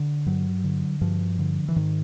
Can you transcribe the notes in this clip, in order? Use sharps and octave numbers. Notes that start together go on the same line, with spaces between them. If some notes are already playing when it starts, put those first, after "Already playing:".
Already playing: D3
G2 F#3
D3
G2 F3
D3
E3
G#2 D#3